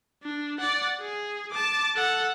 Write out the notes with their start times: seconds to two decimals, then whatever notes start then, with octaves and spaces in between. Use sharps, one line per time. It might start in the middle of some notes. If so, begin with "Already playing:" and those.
0.23 D4
0.59 D5 F#5
1.01 G#4
1.51 A5 D6
1.96 A4 F#5